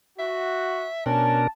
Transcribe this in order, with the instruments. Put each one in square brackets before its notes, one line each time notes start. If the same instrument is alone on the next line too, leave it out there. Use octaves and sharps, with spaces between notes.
[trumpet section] F#4 [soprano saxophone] E5
[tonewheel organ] B2 D4 A#4 [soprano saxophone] C#4 [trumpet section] A5